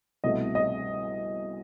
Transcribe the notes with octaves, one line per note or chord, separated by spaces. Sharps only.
C2 B2 A3 D#5
D#5